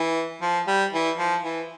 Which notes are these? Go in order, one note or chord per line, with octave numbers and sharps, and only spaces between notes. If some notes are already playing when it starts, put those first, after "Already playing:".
Already playing: E3
F3
G3
E3
F3
E3